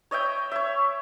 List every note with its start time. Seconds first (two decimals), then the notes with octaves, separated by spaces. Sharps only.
0.11 C#5 D#5 E5 G5
0.51 C#5 E5